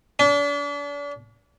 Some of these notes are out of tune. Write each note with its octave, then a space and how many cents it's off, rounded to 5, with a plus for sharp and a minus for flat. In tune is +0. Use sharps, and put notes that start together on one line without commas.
D4 -40